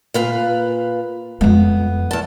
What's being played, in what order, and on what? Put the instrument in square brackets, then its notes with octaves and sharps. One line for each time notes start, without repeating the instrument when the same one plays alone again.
[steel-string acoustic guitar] A#2 B4 F5
[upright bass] F2 G#3 [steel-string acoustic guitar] B3
[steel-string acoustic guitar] E2 A5